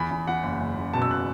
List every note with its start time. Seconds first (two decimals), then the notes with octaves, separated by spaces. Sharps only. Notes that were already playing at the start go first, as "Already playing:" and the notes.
Already playing: E2 B5
0.11 E2
0.27 E2 F#5
0.43 F#1
0.61 F#1
0.77 F#1
0.93 B2 A5
1.02 E6
1.11 F#6